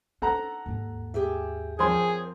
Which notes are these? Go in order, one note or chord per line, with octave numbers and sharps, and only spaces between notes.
D4 D#4 A4 F#5 A#5
D#2 G#2
G4 G#4 E5
F2 C4 G#4 A#4 C5 C#5 C6